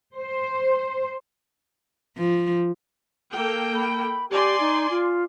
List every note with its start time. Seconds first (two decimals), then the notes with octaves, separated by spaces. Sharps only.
0.18 C5
2.17 F3
3.32 A#3 A4 G5
3.75 B5
4.30 G4 D5 G#5 C6
4.60 D#4
4.90 F4